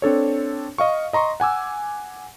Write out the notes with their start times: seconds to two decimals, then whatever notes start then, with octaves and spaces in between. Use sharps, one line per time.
0.02 C4 D4 A4 C#5
0.78 D#5 F5 C#6
1.13 D#5 A#5 C6 C#6
1.40 F#5 G#5 D6 E6